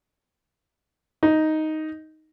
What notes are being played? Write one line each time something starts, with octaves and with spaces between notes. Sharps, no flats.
D#4